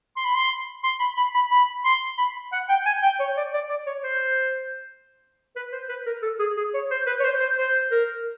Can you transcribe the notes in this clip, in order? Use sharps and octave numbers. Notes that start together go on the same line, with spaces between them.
C6
B5
C6
C6
B5
B5
B5
B5
C6
B5
F#5
G5
G#5
G5
C#5
D5
D5
D5
C#5
C5
B4
C5
B4
A#4
A4
G#4
G#4
C#5
C5
B4
C#5
C5
C5
C5
A#4